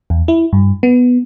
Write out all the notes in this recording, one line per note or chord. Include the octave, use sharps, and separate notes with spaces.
E2
E4
G2
B3